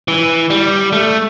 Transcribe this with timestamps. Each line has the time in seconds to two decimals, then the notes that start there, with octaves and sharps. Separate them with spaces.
0.08 E3
0.50 G3
0.92 A3